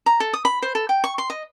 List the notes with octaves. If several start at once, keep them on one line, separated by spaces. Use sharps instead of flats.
A#5
A4
D#6
B5
C5
A4
G5
C#6
C6
D#5